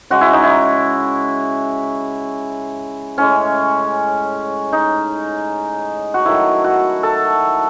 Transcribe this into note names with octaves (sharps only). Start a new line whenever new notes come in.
C#3 G#3 F#4
E4
D#4
E4
A2 G#3 C#4
D#4
F#4
D#3 F#3 A3 E4
F#4
A4